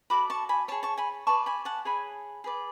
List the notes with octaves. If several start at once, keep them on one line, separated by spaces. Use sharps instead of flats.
F#4 A4 D5 B5 D6
A5 C#6
G#5 B5
G#4 C#5 A5 C#6
A5 C#6
G#5 B5
G#4 B4 D5 A5 C#6
G#5 B5
F#5 A5
G#4 C#5 G#5 B5
G#4 B4 D5